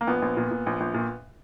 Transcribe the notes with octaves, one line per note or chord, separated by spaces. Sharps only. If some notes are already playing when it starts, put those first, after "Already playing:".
A#3
A#1 B3
A#1
A#2
A#2
A#1
A#1
A#2